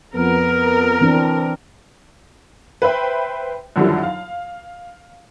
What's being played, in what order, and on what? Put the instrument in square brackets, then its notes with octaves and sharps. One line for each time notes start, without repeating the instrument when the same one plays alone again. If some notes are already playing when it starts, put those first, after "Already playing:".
[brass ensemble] F2 B3 [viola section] A#4
[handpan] E3 C4 D4
[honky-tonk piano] B4 C5 E5 G5
F#2 D3 D#3 F3 G3 E4
F5